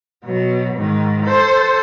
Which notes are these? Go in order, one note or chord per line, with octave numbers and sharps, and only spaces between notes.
B2 F#3
G#2 D#3
A4 C5